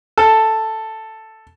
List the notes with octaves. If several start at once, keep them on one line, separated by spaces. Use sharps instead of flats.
A4